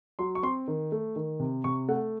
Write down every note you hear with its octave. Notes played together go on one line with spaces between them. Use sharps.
F#3 C6
C#6
C4 C6
D#3
A3
D#3
C3
C3 C#6
A3 F#5